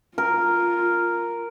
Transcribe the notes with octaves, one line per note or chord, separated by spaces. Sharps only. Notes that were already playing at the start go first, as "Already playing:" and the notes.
F4 A#4